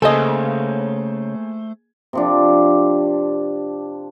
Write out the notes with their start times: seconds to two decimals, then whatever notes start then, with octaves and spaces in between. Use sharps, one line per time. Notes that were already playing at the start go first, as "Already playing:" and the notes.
0.02 C#3 A3 A#3 G#4 A4 C5 D#5 G#5
2.13 C3 F3 D4